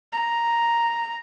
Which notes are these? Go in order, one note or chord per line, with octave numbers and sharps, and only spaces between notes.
A#5